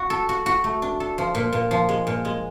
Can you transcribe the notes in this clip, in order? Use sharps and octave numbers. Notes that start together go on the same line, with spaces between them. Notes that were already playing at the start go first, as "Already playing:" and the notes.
Already playing: F#4
A4
F#4
F#4
A3
D4
A4
F3
A#2
A#2
F3
G#3
A#2
G#3